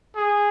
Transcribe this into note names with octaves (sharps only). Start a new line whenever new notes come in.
G#4